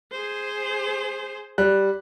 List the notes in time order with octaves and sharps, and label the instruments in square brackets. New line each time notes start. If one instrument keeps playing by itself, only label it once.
[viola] G#4 C5
[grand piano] G3 F#6